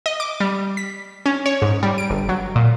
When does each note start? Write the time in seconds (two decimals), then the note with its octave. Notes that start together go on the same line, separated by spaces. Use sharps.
0.06 D#5
0.20 D6
0.40 G3
0.77 B6
1.26 C#4
1.46 C#5
1.62 G#2
1.83 G3
1.98 D7
2.10 G1
2.29 F#3
2.56 A#2